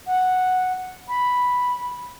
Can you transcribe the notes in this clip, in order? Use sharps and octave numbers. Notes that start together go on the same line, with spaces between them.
F#5
B5